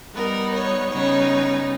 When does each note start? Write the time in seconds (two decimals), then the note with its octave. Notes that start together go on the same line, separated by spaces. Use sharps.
0.15 G3 B3 D#4 A#4
0.54 C#5
0.91 C#3 G3 B3 D#4 C#5